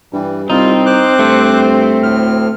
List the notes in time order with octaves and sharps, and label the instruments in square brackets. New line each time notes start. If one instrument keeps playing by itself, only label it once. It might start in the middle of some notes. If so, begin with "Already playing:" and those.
[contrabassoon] G2 [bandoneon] E3 G3
[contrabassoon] C2 [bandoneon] G3 F4 [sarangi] C4 [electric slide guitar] D#4
[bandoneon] C5 D6 F#6
[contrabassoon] G2 [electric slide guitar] A3
[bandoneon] D2 A2 F6